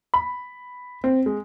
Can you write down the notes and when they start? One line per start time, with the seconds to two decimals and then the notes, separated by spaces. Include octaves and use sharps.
0.14 B5
1.04 C4
1.26 G#3